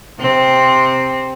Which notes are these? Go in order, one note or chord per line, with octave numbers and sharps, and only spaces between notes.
C3 C4